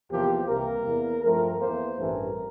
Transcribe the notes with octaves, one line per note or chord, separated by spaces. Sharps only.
E2 C3 F3 A#3 G4
C2 C3 E3 A#3 A#4
E2 E3 A#3
G2 F3 A3 C4 A#4
E2 E3 A#3 C5
A1 G2 E3 A3 C4 A#4